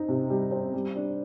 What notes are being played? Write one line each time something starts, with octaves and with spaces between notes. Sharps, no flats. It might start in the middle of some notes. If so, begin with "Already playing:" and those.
Already playing: C4 D#4
C3
G3
C4
G3
D4